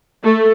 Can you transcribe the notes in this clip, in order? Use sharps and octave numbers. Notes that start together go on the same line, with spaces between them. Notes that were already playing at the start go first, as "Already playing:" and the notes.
A3